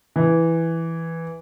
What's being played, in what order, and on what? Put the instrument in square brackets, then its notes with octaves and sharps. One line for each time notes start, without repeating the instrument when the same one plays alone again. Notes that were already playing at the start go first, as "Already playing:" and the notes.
[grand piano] E3